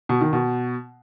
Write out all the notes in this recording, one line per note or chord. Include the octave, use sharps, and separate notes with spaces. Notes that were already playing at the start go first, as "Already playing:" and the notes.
B2
D#3
B2